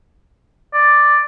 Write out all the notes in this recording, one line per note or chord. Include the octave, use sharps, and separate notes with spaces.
D5